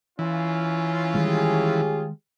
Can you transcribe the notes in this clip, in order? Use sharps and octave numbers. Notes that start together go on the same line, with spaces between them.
E3 C#4 F4
D#3 G3 G#3 G4 G#4